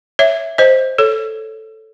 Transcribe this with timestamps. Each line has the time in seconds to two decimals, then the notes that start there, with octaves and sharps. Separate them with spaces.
0.19 C#5 E5
0.58 C5 D#5
0.98 A4 C#5